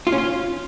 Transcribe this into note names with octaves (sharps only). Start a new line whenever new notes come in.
F4
C#4
F4